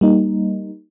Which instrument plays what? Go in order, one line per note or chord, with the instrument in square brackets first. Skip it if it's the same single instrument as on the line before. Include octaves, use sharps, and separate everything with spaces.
[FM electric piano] G3 A#3 D#4